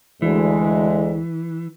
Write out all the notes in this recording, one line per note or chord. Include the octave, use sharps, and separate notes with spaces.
D2 E3 G#3